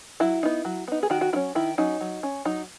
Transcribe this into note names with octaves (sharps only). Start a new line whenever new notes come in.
F#3 E4
B3 D#4
F#3
B3 D#4
G#4
D#3 F#4
F#4
F#3 C#4 E4
D#3 E4
F#3 C#4 D#4
F#3
C#4
F#3 D#4